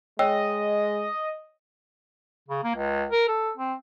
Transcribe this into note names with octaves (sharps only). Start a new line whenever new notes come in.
G#3 C#5 D#5 G5 E6
C#3
A#3
C#2
A#4
A4
C4